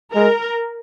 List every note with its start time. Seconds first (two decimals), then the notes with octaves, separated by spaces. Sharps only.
0.14 G#3 A#4